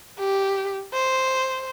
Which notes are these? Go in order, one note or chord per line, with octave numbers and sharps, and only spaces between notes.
G4
C5